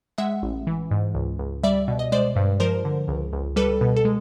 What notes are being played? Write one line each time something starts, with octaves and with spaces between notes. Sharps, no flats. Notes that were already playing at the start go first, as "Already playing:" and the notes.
G#3 E5 F#5
A1
E3
G#2
C#2
C#2
G3 D5 E5
B2
D#5
G#3 C5 D5
G2
F3 A#4 C5
D3
C#2
C#2
G3 A4 B4
B2
A4
G#3